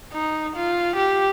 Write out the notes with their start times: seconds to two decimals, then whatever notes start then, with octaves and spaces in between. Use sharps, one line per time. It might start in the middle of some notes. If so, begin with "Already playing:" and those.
0.13 D#4
0.56 F4
0.96 G4